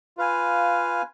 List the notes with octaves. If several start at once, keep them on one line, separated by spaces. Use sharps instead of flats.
F4 B4 F5 G#5